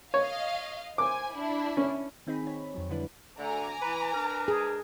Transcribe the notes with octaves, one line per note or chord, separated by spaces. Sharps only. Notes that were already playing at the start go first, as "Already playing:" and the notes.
C#5 D#5 F5
C5 G#5 D6
D4 E4
C#4
D#3 C4 D#4 G#4 B5
D#3 C#5
F2 D#3 F#3
D3 F3 G3 D4 E4 B4
D2 D3 A3 G#5 A#5 D6
E3 B4
D4 A#4 B4
G#4